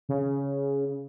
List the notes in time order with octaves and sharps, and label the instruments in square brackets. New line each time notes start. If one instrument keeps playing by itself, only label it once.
[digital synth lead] C#3